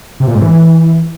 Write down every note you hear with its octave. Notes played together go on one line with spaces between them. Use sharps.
C3
A#2
G#2
E3